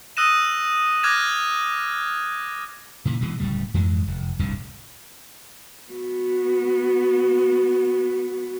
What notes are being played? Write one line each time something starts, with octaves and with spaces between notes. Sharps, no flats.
D#6 E6 F#6 A#6 D#7 E7
D6 F6 F#6 G#6 A#6 E7
A#2 C#3 E3
B2 E3 G#3
D1 A2 C#3 G3
F2 G#2 E3 G#3
F1
D1 C2 G2 D3
B3 F#4